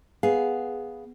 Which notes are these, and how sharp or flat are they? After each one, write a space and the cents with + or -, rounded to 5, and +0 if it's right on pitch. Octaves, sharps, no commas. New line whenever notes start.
B3 +0 G#4 +0 F5 +0